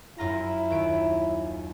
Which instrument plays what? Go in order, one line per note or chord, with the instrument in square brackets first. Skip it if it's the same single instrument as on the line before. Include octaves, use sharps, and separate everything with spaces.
[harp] F#2 F4 A#5 [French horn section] E4
[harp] D#2 D7